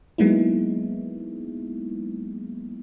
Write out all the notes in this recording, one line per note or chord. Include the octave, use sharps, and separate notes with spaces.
F#3 G#3 A#3 B3 D#4 E4